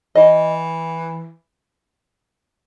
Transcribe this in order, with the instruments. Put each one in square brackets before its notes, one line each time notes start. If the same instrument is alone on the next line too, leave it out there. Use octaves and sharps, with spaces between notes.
[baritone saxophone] E3 [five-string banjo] D#5